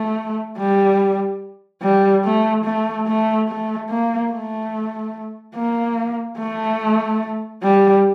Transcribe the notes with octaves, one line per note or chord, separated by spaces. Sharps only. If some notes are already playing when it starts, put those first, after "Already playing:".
Already playing: A3
G3
G3
A3
A3
A3
A3
A#3
A3
A#3
A3
G3